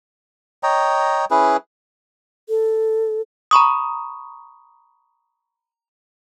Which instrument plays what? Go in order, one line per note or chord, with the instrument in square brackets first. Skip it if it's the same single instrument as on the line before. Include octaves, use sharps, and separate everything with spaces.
[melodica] C#5 D#5 G5 A#5
C#4 E4 G#4 B4
[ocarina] A4
[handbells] A#5 B5 C#6 D#6